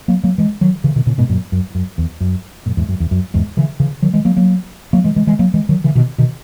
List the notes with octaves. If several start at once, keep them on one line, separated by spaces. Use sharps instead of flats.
F#3 A#3
F#3 A#3
E3 G#3
D#3 F#3
C#3 E3
B2 D#3
A#2 C#3
G#2 B2
F#2 A#2
F#2
F#2
E2
F#2
F#2 A#2
E2 G#2
F#2
E2
F#2
E2 G#2
C#3 E3
C#3 E3
D#3 F#3
E3 G#3
F#3 A#3
F#3 A#3
F#3 A#3
E3 G#3
E3 G#3
E3 G#3
F#3 A#3
E3 G#3
D#3 F#3
C#3 E3
B2 D#3
B2 D#3